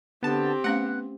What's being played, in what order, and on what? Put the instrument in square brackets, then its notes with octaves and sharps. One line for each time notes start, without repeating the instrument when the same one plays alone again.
[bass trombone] D3 [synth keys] B3 A5 [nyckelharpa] C4 G4
[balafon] A3 C#4 F5 [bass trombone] B3 [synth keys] F#5